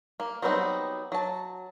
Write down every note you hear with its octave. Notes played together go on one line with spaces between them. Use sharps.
A#3
F#3 G3 B3 C4 D#4
F#3 A5